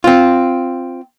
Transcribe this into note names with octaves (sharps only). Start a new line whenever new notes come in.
C4 F4